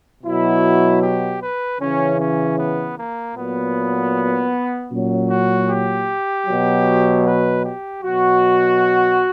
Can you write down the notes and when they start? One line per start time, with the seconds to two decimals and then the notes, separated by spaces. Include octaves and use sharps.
0.23 B2 F#3 E4
1.02 G4
1.41 B4
1.79 C#3 E3 C#4
2.19 C#4
2.57 B3
2.97 A#3
3.35 A#2 F#3 B3
4.90 A#2 F#3 C#4
5.29 F#4
5.68 G4
6.46 B2 F#3
7.24 B4
7.63 G4
8.02 B2 F#3 F#4